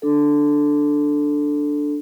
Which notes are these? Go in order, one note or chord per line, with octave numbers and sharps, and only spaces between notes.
D4 A4